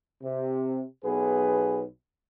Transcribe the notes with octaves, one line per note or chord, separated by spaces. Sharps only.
C3
B1 B3 G#4 B4